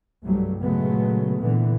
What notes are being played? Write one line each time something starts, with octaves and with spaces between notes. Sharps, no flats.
C2 G2 F#3 G3 A3
A#2 C#3 F#3 G#3 A3 B3
A#2 D3 E3 B3